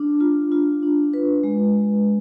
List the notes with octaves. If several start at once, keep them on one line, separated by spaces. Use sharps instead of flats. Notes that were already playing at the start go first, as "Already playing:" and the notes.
Already playing: D4
F4
F4
D4
B4
G#3